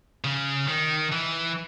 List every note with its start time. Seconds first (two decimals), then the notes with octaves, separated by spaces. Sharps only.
0.24 C#3
0.68 D#3
1.12 E3